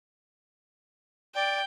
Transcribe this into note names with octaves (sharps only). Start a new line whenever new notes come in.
D5 G5